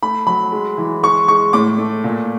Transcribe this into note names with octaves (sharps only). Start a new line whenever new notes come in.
A3 B5
F#3 B5
G#3
E3
G#3 C#6
G#3 C#6
A2 D6
A3
A#2